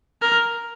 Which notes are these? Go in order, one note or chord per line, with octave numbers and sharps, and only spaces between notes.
A#4